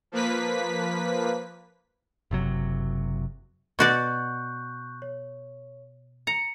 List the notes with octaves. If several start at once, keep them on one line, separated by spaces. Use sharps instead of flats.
F3 A#3 B4 B6
F#1 C3 F#3
B2 F#4 D5 C#6 F#6 G6
C#5
A#5 C#7